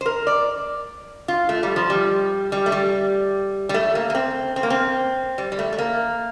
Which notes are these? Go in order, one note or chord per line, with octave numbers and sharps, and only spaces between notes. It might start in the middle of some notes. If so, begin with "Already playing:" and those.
C5
A#4
D5
F4
A3
G3
F3
G3
G3
A3
G3
G3
A3
A#3
A#3
C4
C4
A#3
C4
G3
G3
A3
A3
A#3